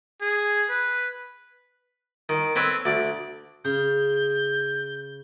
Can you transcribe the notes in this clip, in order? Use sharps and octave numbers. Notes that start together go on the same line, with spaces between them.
G#4
B4
D#3
C4 A4 B4 C#5
D2 D5
C#3 G6